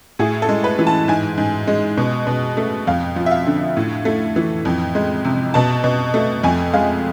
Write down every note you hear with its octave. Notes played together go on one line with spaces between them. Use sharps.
A2 G#4
A4
G#3
B4
E3
A5
G#2 G#5
G#2
G#3
B2
B2
A3
F2 F5
F3
E5
F5
D3
A2
A3
E3
F2
G#3
C3
B2 A5
B2
A3
F2 G#5
G#3 F5